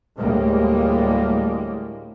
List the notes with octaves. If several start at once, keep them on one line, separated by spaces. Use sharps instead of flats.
D2 A2 G3 G#3 A#3